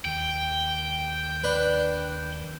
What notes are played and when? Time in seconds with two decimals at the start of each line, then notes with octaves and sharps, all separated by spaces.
0.05 D#2 D#3 G5
1.44 D4 B4